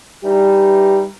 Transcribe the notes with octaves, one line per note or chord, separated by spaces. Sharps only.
E3 G3 D#4 G4